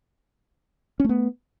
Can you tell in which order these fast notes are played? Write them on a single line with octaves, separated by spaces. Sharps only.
C#4 A3 B3